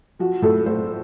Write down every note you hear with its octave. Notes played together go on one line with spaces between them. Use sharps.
F3 F#4
A2 A4
A2 C5